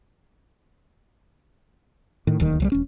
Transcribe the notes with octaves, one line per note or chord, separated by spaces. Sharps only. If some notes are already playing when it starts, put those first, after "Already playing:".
A2 D#3
D1 D#2 D#3
C2 F#3 G3
E1 C#4